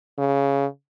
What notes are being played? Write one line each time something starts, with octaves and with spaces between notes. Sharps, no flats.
C#3